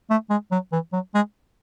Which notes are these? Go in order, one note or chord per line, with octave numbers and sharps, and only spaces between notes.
A3
G#3
F#3
E3
F#3
G#3